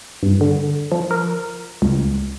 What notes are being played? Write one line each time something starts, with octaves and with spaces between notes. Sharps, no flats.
G2
D3
F3
A#4
C#2